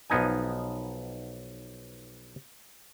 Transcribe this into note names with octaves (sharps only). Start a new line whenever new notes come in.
B1 F3 B3 D#4 G#5